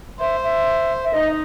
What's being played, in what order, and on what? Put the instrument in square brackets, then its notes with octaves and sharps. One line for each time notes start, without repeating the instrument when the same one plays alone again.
[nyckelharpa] C5 [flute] E5
[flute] E5
E5
[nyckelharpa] D#4 [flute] D#5